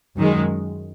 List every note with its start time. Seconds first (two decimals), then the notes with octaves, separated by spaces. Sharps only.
0.17 F#2 D#3 G#3